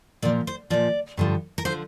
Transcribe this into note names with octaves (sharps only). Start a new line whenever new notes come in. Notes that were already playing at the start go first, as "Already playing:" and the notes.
A#2 F3 D5
C5
A#2 F3 D5
G2 D3 F3
A#4
D3 F3 C5